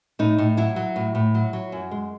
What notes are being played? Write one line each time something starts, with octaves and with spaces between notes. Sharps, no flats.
A2 D#4
A2
F#3 E4
F#3
A2
A2
F#3
F#3
F#2
G#3